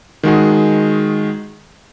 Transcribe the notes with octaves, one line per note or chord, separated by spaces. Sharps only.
D#3 G#3 F#4 G#4